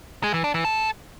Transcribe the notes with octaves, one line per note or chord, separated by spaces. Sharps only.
G#3
E3
D4
E3
A4